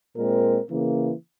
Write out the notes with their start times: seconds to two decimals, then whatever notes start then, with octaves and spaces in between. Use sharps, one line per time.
0.16 A#2 G#3 C4 A#4
0.69 C#3 E3 A#3